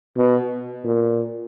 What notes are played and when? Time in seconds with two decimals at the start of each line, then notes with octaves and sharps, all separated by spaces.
0.17 B2
0.84 A#2